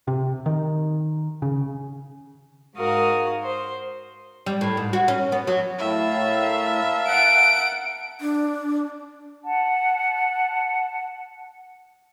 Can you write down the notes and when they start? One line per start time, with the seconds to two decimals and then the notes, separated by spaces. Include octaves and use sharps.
0.08 C3
0.46 D#3
1.42 C#3
2.75 G#2 F#4 A#4 F5 D#6
3.42 C5
4.46 G3
4.61 A2
4.77 G#2
4.93 F#4
5.08 C#4
5.32 B3
5.47 F#3
5.78 A2 A#4 E5 F5 A5
7.07 F#5 D7
8.21 D4
9.44 F#5 A5